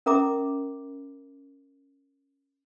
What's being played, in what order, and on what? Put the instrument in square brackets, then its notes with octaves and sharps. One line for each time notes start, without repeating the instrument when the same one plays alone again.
[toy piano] C#4 A#4 E5 A#5 D6